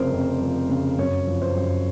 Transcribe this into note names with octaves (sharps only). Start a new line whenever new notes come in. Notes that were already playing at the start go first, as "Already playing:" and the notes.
Already playing: F1 C#3 F3 A#4 C5
F2
F3
C#3
F#2 C#5
F3
C5
F#2